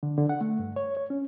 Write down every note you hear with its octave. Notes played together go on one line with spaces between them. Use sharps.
D3
D3
F#5
A3
G2
C#5
C#5
C#4